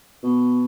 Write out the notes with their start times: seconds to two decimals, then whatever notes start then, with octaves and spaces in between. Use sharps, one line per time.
0.23 B2